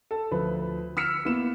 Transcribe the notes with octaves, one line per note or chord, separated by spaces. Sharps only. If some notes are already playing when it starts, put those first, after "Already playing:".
A4
D2 F3 B4
E6 F6 B6 C#7 E7
A#3 B3 E4 E7